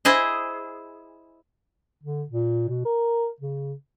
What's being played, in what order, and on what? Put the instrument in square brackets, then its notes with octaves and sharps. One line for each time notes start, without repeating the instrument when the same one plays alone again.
[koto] E4 G#4 C5 D#5
[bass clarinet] D3
A#2
B2
A#4
C#3